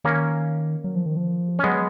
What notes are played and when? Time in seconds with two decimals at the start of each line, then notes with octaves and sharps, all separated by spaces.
0.04 D#3 A#3 C#4
0.84 F#3
0.95 F3
1.06 D#3
1.17 F3
1.59 C#4
1.64 F#3 G#3 B3